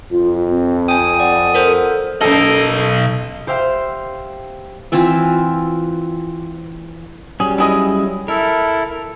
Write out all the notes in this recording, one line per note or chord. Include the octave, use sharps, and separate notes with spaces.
F2 F4
C4
G5 G#5 D#6
D5 F#5
A4 A#4 C5
B1 F#2 A#3 A4 D#5
G4 C5 E5 F5 G5
E3 C4 F4 E5
F#3 G3 C#4 G#4
E4 G#4 D#5
E4 A4 A#4 E5